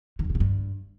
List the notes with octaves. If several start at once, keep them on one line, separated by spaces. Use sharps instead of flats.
D#3
E2
C3
C#3
G2